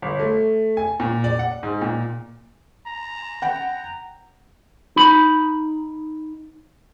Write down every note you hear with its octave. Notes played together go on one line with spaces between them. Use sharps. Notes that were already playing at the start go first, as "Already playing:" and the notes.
G1
A3
G#5
A#2
D5
F#5
G#2
A#2
A#5
F#5 G5
D#4 B5